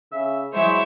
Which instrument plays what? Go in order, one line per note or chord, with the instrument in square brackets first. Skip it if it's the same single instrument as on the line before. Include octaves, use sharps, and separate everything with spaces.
[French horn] C#3 [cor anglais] E5
[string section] F#3 E4 [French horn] G#3 [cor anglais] C5 [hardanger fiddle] C#5 E5